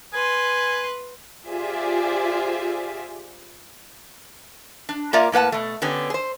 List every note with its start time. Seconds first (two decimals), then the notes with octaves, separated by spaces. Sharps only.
0.13 B4 G#5 C6
1.47 F4 G4 G#4 C5 D5 E5
4.89 D4
5.13 A#3 F4 A#4 D5 E5 A#5
5.32 A2 A#3 B4 F#5 A5
5.52 B2 A3
5.82 D3 B3 C#4 G4
6.10 G#4 C5